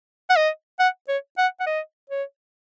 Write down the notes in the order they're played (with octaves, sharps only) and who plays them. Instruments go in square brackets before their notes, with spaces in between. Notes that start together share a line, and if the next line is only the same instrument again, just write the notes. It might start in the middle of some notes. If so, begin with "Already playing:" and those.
[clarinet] F#5
D#5
F#5
C#5
F#5
F#5
D#5
C#5